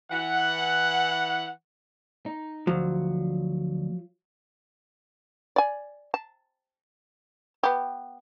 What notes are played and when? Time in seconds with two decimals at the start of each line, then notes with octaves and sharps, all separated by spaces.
0.11 E3 F#5
2.26 D#4
2.67 D2 F3 F#3
5.56 D5 G#5
6.14 A5
7.63 B3 G4